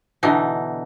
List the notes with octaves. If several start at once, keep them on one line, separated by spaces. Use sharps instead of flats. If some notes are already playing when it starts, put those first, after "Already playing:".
B2 D3 E3 D#4